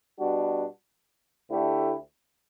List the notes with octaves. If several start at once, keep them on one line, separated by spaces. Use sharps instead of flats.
B2 G3 D4 F#4
D2 D3 A3 E4 G4